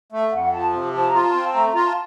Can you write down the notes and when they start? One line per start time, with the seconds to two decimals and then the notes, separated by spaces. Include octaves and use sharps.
0.12 A3
0.33 F2 F#5
0.52 F3 A5
0.73 C3
0.93 F3 A5
1.08 A#5
1.13 F4
1.23 A5
1.34 C4 A5
1.54 A3 A#5
1.70 F4 A#5
1.85 A5